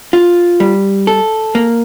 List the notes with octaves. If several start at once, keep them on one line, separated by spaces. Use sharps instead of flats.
F4
G3
A4
A#3